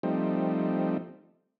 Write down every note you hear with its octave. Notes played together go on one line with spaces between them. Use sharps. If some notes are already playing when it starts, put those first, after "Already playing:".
F3 G3 A3 C4 D#4